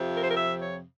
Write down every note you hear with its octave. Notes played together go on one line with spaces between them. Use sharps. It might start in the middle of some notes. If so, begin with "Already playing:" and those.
Already playing: F2 C3 F3
A#4
C5
A#4
E5
C#5